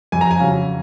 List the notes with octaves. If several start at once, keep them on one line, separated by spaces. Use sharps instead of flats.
F2 G#5
A#5
G#5
C#3 F#3